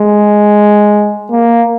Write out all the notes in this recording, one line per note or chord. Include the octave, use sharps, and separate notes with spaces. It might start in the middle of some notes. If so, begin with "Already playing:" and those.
Already playing: G#3
A#3